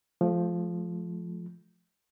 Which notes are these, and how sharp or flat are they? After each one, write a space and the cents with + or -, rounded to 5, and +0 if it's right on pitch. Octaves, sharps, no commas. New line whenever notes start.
F3 +0 A3 -40